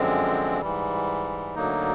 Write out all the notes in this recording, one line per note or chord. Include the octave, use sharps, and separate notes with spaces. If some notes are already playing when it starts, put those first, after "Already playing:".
Already playing: F#2 D3 F3 G#3 C4
G#2 E3 G3
D2 D3 F#3 A#3 D#4